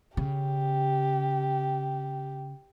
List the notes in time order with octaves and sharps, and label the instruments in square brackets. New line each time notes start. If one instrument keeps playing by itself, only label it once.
[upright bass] C#3 [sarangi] G4